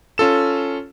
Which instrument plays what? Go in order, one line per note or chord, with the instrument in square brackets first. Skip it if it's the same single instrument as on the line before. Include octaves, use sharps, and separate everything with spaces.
[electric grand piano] C#4 F4 A4 E7